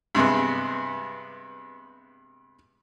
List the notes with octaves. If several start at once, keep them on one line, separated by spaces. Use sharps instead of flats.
G2 C3 G#3 B3